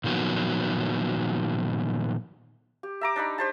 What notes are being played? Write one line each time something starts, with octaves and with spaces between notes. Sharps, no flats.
A#2 D#3 F3 F#3 B3
G4
E5 A#5 D6
D4 D#4 B5
G4 C5 A5